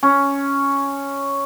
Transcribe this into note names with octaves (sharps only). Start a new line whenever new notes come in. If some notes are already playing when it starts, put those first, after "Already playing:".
C#4